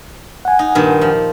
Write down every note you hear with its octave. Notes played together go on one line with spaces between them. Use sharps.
F#5 G#5
D#4
G2 A#2 D#3
F3